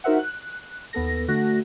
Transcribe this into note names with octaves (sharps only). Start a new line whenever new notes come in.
D#4 F#4 A#4 C5 E5 F#5
F#6
D#2 B3 A4 A#6
D3 A3 F#4 F#6 A#6